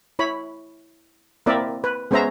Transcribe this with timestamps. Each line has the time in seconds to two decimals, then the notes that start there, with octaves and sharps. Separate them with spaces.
0.19 E4 C#5 B5
1.46 A#3 C4 E4 A#4 D5 E5
1.84 B4
2.11 G#3 B3 C#4 C5 E5 A#5